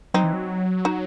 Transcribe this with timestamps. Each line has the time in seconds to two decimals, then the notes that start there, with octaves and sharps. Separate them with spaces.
0.14 F#3 C4 D#4
0.23 E3
0.33 F#3
0.85 D#4 F#4